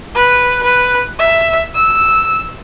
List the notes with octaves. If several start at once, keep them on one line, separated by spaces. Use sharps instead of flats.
B4
B4
E5
E6